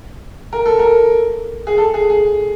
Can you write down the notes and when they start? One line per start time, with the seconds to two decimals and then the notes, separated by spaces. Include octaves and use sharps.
0.53 A#4
0.66 A4
0.79 A#4
1.67 G#4
1.78 A4
1.94 G#4
2.10 G#4